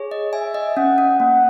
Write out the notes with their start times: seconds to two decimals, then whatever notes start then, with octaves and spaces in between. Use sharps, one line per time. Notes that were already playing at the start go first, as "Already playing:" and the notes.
Already playing: G#4 C#5
0.11 D#5
0.33 E5 G#5
0.54 D#5
0.77 C#4 F#5
0.98 C#4
1.20 A#3 F#5